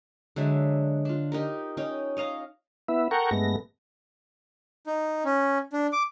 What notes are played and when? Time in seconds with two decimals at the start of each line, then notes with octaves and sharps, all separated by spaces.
0.36 D3 F#3 G#3 E5
1.05 D4 F4
1.32 D#4 G4 A#4
1.77 C#4 D#4 G5
2.17 C#5 D#5 F5 A#5
2.88 B3 E4 E5
3.11 A4 A#4 F#5 G5 A#5 C#6
3.31 G2 G#3 A3 B3 A#6
4.87 D#4
5.25 C#4
5.73 D4
5.93 D6